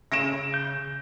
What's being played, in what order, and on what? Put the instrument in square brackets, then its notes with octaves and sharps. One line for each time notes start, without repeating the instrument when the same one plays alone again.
[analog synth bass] C#3 [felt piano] A#6 D7 E7
[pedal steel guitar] G6